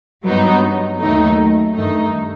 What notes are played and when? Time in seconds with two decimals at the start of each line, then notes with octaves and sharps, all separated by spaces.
0.24 G2 F#3 B3 D#4
1.00 D#2 D#3 F#3 A3 D#4
1.75 G2 D#3 A3 D#4